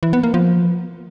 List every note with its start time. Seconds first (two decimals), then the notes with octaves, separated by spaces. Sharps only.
0.03 E3
0.13 B3
0.23 A#3
0.34 F3